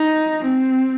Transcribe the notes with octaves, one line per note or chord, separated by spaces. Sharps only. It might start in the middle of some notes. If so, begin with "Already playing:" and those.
Already playing: D#4
C4